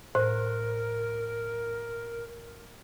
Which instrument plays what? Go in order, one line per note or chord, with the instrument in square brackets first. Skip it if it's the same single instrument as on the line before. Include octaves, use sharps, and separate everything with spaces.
[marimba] A2 [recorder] A#4 [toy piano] C5